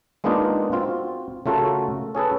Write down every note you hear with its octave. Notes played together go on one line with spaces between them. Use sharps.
G#3 A#3 B3 D4 D#4 F4
C4 F4 F#4
C#3 A3 F4 F#4 A4 A#4
C#4 G#4 A4 B4